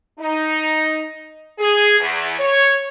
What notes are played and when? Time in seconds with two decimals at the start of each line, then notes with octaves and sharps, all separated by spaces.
0.19 D#4
1.59 G#4
1.99 E2
2.39 C#5